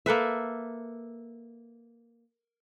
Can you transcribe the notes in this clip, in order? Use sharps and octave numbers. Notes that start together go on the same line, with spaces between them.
A#3 A4 B4 E5